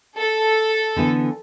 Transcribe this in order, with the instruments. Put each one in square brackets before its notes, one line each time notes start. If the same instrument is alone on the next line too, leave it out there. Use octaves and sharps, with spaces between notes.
[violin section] A4
[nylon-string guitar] D3 E3 B3